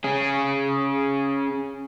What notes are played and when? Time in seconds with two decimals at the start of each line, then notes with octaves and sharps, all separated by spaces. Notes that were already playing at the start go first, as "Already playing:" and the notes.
0.04 C#4 G#4